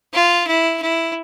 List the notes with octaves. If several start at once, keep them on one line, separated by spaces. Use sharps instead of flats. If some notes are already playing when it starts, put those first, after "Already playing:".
F4
E4
E4